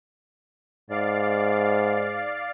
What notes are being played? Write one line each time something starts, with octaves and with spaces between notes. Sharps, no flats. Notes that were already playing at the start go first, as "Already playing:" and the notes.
G#2 D5 F5